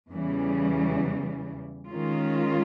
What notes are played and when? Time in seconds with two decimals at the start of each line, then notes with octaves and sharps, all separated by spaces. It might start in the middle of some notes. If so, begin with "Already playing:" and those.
0.11 E2 C#3 E3 G3
1.88 D#3 G#3 C#4 F4